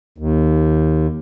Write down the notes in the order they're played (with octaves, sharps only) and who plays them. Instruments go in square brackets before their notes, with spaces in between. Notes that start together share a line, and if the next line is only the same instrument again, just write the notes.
[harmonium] D#2